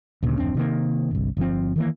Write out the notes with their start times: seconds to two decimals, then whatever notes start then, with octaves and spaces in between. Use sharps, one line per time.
0.23 D2 A#2 C#3
0.38 D1 F2 C4 D4
0.55 C3 D#3 A#3
1.11 G1 C2
1.37 G1 F3 C4
1.76 D#3 E3 A#3